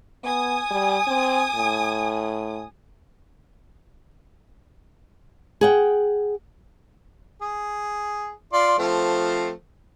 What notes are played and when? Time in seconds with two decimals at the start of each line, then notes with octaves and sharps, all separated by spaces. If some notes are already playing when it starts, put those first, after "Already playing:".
0.24 B3 G#5 D#6
0.71 G3
1.07 C4
1.55 A2
5.61 G#4 F#5 G5
7.42 G#4
8.53 F4 D5 C6
8.78 F3 A3 C4